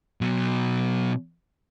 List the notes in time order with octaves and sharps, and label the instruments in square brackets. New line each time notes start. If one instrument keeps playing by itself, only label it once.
[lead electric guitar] B2 F#3